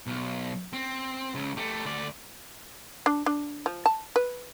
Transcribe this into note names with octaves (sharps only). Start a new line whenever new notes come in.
B1
C4
C#2 C#3
A3 G4
D2 D5
D4
D4
F3
A5
B4